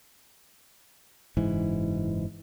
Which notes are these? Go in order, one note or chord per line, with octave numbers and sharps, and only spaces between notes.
F#1 G#2 E3